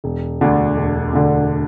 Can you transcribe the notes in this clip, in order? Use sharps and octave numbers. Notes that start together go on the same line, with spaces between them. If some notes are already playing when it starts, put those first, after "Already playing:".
E1
D2 D3
E1
D2 D3